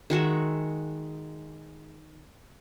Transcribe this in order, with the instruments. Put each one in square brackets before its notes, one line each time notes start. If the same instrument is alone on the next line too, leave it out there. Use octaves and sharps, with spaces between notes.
[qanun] D#3 G#3 F#4 E5